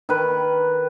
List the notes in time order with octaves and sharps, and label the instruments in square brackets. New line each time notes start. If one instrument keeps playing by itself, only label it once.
[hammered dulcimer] D#3 B4